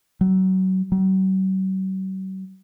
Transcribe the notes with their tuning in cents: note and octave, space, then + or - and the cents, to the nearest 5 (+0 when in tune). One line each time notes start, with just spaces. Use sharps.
F#3 +25
F#3 +45